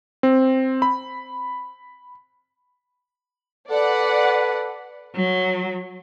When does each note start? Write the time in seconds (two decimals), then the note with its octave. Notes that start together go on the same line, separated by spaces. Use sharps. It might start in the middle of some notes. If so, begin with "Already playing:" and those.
0.23 C4
0.82 B5
3.71 A4 B4 D5 F#5
5.15 F#3